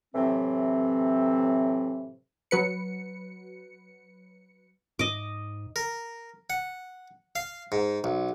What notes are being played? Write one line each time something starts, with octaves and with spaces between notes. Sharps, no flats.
A2 C3 E3 F#3 C4
F#3 B4 C#7
G#2 D#5 D6
A#4
F#5
F5
G#2
B1